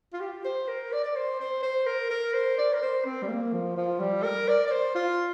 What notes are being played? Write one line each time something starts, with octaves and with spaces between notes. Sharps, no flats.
F4
G4
C5
A#4
D5
D5
C5
C5
C5
A#4
A#4
C5
D5
A#4
C5
C4
G3
A#3
F3
F3
G3
A#4
D5
D5
C5
F4